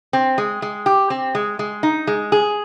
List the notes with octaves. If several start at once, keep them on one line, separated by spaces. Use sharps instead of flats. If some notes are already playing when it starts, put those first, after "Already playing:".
C4
G#3
G#3
G4
C4
G#3
G#3
D#4
G#3
G#4